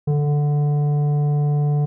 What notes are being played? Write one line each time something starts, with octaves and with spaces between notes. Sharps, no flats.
D3